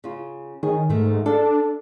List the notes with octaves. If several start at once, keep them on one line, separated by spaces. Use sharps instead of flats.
C#3 F4
D#3 G#4 C#5
G#2 D#3 A3
D4 A4 F5